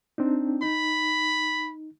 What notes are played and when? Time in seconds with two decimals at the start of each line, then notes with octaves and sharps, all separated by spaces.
0.18 C4 D4 D#4
0.62 D#4 B5